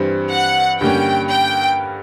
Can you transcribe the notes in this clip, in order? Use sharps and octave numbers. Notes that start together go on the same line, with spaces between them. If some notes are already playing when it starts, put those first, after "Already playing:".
Already playing: G2 E3 G3 C4
F#5
G2 D3 G3 A#3 C#4 G5
G5